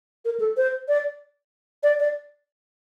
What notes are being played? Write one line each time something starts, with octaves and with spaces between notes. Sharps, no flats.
A#4
A4
C5
D5
D5
D5